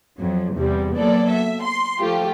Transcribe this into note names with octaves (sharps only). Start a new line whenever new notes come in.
F2 F#3
E2 C3 G3
F#3 A#3 B3 A4 D5
E5
C6
F3 A3 F4 G4